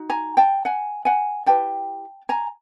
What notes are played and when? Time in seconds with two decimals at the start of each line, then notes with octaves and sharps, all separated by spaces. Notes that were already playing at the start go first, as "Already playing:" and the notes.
Already playing: D#4 F#4
0.10 G#5 A#5
0.37 G5 A5
0.65 F#5 G#5
1.05 F#5 G#5
1.46 E4 G4 B4 G5 A5
2.29 G#5 A#5